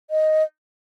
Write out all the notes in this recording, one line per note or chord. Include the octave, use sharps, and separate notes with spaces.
D#5